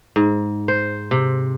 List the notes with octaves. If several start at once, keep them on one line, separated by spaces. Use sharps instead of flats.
G#2
C5
C3